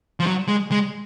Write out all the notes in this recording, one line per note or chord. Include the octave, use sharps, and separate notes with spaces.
F3
F#3
G#3
G#3